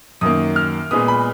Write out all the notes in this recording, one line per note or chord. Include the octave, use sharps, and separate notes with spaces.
F#2 D#3 A#3 D#6
F6
A#2 G#3 B3 D#6
B5